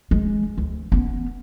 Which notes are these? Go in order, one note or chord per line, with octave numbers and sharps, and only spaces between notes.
G#3
D2
B3 C#4